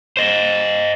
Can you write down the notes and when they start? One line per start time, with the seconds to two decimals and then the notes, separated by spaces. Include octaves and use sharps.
0.17 C5 D#5